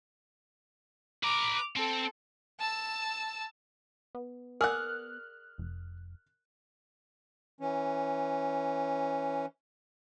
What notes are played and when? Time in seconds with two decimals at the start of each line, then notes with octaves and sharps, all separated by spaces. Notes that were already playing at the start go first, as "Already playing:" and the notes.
1.23 B4 A#5 D6
1.77 C4 A4
2.59 A5 E6
4.15 B3
4.61 G#4 A#4 D5 F#5 F6 F#6
5.58 F1
7.60 E3 C#4